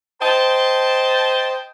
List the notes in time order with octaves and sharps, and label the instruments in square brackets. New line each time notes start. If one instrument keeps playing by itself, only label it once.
[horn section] C5 D#5 G5 A5